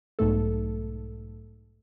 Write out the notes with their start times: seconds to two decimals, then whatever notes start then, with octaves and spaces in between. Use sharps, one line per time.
0.19 B1 G#2 A3 A4